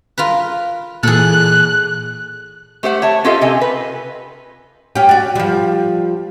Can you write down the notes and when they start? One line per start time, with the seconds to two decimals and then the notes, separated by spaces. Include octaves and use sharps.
0.18 F4 A#4 B4
1.03 A#2 E3 G#4 A4 F#6
2.83 A3 G4 C5 F#5
3.02 C#5 E5 A5
3.24 C#4 F4 G4 A4 D#5 F5
3.41 C3 A4 D#5 G#5
3.61 B4
4.95 C#4 G4
5.09 F#4 D5
5.36 F3 G3